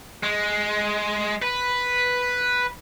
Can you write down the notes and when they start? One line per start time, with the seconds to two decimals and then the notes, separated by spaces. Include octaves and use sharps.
0.23 G#3
1.42 B4